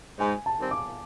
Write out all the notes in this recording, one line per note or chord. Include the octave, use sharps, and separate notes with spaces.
G#2 G#5
A5
D#3 G3 C4
D6